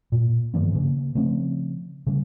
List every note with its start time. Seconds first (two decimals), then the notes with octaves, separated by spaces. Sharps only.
0.12 A#2
0.54 G2 D#3 F3 B3
0.75 C#3 A#3
1.15 C#3 F3 A3 C4
2.07 C#3 G3